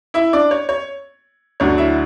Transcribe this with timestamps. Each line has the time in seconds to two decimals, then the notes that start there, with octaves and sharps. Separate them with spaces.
0.14 E4 E5
0.33 D4 D5
0.51 C#5
0.69 C#5
1.60 D2 D3 F#3 C#5
1.78 E4 E5